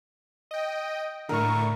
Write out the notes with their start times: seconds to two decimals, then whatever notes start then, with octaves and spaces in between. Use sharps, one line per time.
0.51 D#5 G5
1.29 A2 D3 A#4 C#6